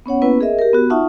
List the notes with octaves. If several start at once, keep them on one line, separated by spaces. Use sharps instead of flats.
B3 C#4 C#5 F#5
A#3 B3 C#4 E4 B4
G#4 A#4 D#5 E5
G4 A#4
B3 F#4
D#4 F4 E5 F#5 A5 C#6